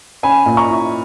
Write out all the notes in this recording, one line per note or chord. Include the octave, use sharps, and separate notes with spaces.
C#4 G#5 B5
A#2
A#5 C#6
E4